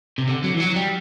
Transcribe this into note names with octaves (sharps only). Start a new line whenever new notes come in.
C3
D3
F#3
E3
F#3
G3